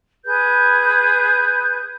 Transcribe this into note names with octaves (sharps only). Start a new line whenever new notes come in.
G#4 B4 G6